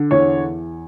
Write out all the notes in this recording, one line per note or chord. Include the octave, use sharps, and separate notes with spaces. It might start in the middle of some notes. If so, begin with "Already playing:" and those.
Already playing: D3
E2 C#5